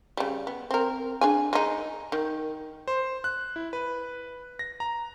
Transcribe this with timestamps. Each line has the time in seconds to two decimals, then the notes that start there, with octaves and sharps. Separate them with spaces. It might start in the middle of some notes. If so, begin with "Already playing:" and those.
0.17 C#3 G3
0.47 B3
0.71 C4 A#4
1.21 D4 G#4 G#5
1.53 G#3 D#4
2.12 D#3
2.88 C5
3.24 F#6
3.56 E4
3.73 B4
4.59 A#6
4.80 A#5